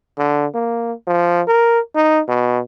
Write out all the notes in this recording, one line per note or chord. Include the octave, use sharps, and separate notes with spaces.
D3
A#3
F3
A#4
D#4
B2